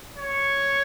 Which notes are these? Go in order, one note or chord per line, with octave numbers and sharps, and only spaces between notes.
C#5